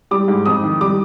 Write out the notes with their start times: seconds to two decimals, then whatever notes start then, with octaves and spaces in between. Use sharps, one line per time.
0.11 G3 D6
0.28 G#2
0.46 F2 D#6
0.64 D#3
0.81 G3 D6